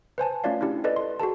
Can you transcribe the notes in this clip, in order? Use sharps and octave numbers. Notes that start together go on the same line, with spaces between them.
B4 C5 G#5 A5
A3 C#4 F4 C#5 D5 F5
C#4 D4 E4 G4
A4 B4 D5 D#5
C6
F#4 G#4 A4 A5